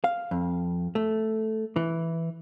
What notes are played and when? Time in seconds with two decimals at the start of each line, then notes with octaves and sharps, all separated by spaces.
0.04 F5
0.31 F2
0.95 A3
1.76 E3